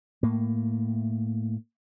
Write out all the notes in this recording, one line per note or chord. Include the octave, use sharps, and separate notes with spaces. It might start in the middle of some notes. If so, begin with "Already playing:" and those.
A2 A#3